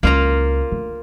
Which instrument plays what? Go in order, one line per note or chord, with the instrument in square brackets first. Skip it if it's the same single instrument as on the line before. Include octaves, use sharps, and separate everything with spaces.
[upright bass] C#2 E4 [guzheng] A#3 F4 A#5
[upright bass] D3